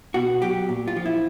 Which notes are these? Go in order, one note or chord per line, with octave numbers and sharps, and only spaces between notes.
B2 F#4
F#3 G4
A#2
F4
F3
E4